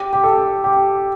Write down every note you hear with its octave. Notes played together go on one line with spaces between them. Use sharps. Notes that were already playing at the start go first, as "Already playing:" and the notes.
Already playing: G4
G4
A4
G4